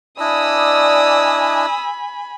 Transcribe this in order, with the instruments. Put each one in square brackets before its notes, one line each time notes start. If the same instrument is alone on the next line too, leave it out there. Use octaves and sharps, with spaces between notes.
[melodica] D4 E4 D#5 [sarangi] D5 [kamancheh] G#5 B5 [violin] D#6 E6